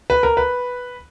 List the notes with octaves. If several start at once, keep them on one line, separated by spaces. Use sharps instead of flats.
B4
A#4
B4